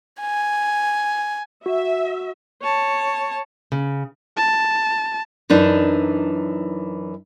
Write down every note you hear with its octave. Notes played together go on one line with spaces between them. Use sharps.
G#5
F#4 E5
C#5 A5
C#3
A5
F#2 E3 D4 D#4